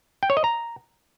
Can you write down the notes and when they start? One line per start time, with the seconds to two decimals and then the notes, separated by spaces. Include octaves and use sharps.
0.23 G5
0.30 C#5
0.37 D#5
0.44 A#5